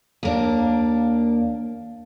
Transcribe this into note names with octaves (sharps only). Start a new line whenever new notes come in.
D#2 A#3 D4